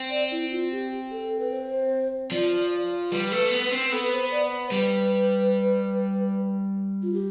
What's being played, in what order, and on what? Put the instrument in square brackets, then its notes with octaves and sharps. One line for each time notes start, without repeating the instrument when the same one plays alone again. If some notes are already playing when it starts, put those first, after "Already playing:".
Already playing: [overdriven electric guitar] C4
[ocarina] D5
E4
F4
G4
A4
B4
C5
[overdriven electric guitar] F3 [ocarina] D5
[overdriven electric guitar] G3 [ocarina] B4
[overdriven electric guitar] A3
B3
C4
[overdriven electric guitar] B3 [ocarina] A4
[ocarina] B4
C5
D5
C5
[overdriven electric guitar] G3 [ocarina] B4
[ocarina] F4
G4